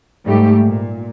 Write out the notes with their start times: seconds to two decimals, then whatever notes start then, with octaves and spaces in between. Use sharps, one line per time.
0.25 G#2 G3 A3 G4
0.64 A#2